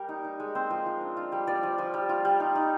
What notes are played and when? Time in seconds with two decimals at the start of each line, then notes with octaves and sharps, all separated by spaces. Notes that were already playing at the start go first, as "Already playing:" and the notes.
Already playing: G3 G4 A#4
0.09 D#4
0.24 D#4
0.40 G#3
0.55 C4 C5
0.71 F3
0.86 F3
1.01 D4
1.17 F4
1.32 G3
1.47 F3 D5
1.63 F3
1.78 F3
1.94 G3
2.09 F4
2.25 G3
2.40 D#4
2.55 D#4